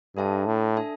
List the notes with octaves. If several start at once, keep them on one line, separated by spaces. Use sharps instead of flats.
G2 D4 A4 E5 A5
A2
D4 A4 E5 A5